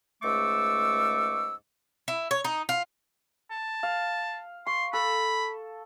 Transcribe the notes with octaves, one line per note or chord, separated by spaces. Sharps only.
C#2 G#2 A3 C#6 D6 E6
E4
C#5
D#4
F4
A5
F5
C6 C#6
A4 B5